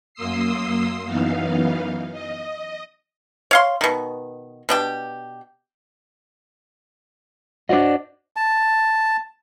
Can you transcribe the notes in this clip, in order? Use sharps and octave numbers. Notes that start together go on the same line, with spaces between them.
F#2 A#3 C6 D#6 E6 C7
F#2 E3 B3 D#4 F5
D#5
C#5 F5 C6
B2 D#3
B2 D4 G4
D4 F#4 C5 D5 D#5
A5